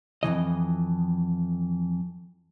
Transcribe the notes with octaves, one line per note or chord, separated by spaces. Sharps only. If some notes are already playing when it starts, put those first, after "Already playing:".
F2 B2 E3 D#5